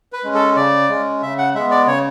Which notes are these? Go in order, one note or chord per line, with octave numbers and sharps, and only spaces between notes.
B4
G#3 C#4
A4
C#3 D5
G#3 C#4
C#3 E5
F#5
G#3 B3 E5
D5
C#3 C#5